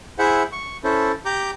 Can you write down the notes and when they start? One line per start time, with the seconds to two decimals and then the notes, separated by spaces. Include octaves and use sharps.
0.19 E4 G#4 C5 E5 F#5
0.52 C#6
0.84 C#4 E4 A4 C5
1.26 G4 A#5 D6 G6